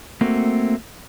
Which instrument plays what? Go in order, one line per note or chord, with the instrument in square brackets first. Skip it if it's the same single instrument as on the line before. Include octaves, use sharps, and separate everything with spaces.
[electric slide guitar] A3 A#3 C4 F#4